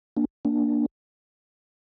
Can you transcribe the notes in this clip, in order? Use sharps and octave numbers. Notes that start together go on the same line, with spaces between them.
A#3 D4
A#3 D4